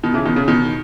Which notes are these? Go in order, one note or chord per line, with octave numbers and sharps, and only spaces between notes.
B2 D#3
C#3 E3
B2 D#3
C#3
B2 D#3